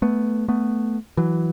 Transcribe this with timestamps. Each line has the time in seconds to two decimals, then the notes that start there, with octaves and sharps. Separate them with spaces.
0.02 A3 B3
0.48 A3 B3
1.17 E3 F#3